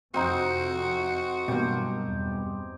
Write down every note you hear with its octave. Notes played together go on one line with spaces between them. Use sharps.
F2 C3 C4 D#4 F#4
G2 B2 E3 F#3 A#3 G4
E2